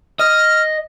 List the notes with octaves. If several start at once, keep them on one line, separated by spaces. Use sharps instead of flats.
D#5 F6